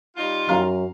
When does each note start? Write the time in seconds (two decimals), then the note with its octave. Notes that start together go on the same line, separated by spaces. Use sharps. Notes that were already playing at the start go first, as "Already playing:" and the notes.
0.17 G3 D#4 F4
0.49 F#2 F5 A#5